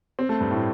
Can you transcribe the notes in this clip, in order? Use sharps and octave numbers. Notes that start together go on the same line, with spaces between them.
C4
A3
G2
A2